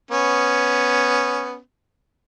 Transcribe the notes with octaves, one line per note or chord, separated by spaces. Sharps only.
B3 C#4